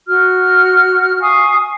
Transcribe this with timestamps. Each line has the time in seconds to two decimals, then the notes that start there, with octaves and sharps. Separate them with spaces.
0.06 F#4 F6
1.20 F5 G#5 C#6 D#6